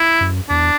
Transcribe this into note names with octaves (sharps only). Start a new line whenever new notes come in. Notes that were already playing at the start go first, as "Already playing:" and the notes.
Already playing: E4
F#2
E2 D4